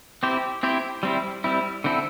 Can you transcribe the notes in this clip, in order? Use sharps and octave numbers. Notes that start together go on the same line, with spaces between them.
C4 E4 G4 C5
C4 E4 G4 C5
G3 C4 E4
G3 C4 E4
D3 C4 E4 A4